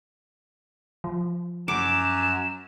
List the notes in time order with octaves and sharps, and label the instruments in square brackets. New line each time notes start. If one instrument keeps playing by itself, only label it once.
[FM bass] F3
[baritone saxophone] F#2 [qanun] D6 [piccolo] E7